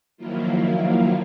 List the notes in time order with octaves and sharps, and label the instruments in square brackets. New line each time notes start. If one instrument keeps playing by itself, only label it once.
[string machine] D#3 F3 F#3 A#3 E4 F4